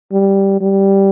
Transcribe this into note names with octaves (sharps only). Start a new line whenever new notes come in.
G3
G3